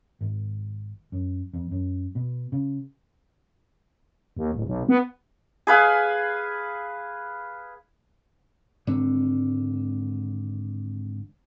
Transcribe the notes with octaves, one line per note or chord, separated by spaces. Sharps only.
G#1
F#2
F2
F#2
B2
C#3
D#2
D1
B1
B3
G#4 B4 F5 G#5
G#1 D3 C4